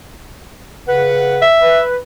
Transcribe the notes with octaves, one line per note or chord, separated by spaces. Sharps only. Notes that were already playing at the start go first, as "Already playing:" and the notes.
C#3 B4 F#5
E5
B4